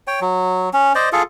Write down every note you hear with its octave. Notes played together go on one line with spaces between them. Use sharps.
C#5 G5
F#3
C#4
C5 D5 D#5
F4 G#4 A4